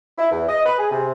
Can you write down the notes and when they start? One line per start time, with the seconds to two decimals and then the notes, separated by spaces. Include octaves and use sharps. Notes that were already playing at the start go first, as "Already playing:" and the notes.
0.18 E4
0.31 E2
0.48 D#5
0.65 B4
0.79 G#4
0.91 C3